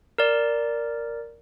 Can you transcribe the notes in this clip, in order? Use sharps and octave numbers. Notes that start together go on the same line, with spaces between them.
A#4 D5